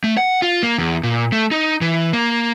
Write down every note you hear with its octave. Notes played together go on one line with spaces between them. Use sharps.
A3
F#5
F4
A#3
E2
A#2
A3
D#4
E3
A#3